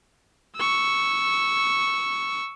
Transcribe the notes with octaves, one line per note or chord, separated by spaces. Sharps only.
C#6 E6